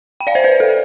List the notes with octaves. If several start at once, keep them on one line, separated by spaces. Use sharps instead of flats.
G5
D5 F5
C5 E5
B4 D5
A4